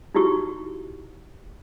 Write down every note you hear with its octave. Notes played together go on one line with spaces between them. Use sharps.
D#4 E4 F#4 G4 C#6